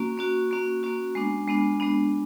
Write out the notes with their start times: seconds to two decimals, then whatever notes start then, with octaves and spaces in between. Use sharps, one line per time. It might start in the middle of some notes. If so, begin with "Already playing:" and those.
Already playing: A#3 C#4 F#4
0.18 A#3 C#4 F#4
0.51 A#3 C#4 F#4
0.83 A#3 C#4 F#4
1.15 G#3 B3 D4
1.48 G#3 B3 D4
1.80 G#3 B3 D4